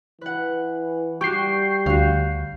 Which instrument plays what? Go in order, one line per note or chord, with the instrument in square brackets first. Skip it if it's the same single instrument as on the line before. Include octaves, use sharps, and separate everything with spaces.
[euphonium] E3 [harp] B4 F#5
[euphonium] G3 [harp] F#4 G4 [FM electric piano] C#6 G6 C7
[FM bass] D2 [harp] F#4 F5